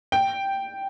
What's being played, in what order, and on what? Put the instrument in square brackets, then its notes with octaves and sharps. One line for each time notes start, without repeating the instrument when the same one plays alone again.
[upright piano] G5